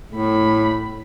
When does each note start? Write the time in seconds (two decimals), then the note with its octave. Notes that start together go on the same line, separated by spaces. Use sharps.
0.12 A2 A3 B5